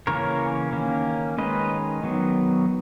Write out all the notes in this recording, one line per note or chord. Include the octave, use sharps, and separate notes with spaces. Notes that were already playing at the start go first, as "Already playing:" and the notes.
C#3 E3 A#3 C#4 A#4 C#5
D#3 A#3 C#4
D#3 G#3 C#4 B4 D#5
D#3 F#3 B3